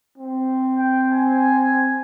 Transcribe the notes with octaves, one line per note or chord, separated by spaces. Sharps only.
C4
G5
G#5